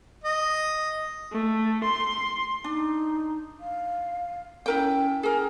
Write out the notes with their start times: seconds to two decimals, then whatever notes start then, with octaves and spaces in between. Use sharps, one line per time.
0.24 D#5
1.32 A3
1.84 C6
2.64 D4 D#4
3.60 F5
4.66 C#4 E4 A#4 G5
5.23 G#4 A#4 G#5